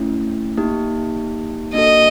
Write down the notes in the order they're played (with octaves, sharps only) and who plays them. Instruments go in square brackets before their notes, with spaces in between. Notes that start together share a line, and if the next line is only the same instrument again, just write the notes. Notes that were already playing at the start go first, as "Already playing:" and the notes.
Already playing: [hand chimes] A3 C#4 E4
A#3 D#4 G4
[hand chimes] A#3 D4 F#4 A4 [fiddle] D#5